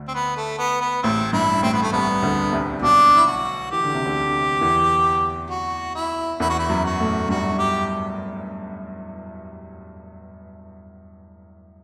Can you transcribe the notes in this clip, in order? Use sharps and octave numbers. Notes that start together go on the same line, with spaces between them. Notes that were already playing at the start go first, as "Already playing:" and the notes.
Already playing: D2 D3
C4
B3
A3
B3
B3
A1 A2 C4
G2 E4
A1 A2 C4
B3
A3
C2 C3 B3
D2 D3
C2 C3
B1 B2 D4
E4
F#4
E3 G4
D3
C3
D2 D3
E2 E3
F#4
E4
E2 E3 E4
F#4
E4
F#2 F#3
F#4
A2 A3
G2 G3 F#4
G4